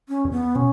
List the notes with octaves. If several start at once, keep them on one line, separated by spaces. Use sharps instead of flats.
C#4
E2
B3
B2 C#4